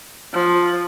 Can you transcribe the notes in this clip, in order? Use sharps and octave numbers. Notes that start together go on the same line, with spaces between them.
F3